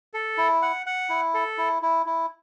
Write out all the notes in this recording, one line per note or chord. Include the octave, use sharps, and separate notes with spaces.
A4
E4
F#5
F#5
E4
A4
E4
E4
E4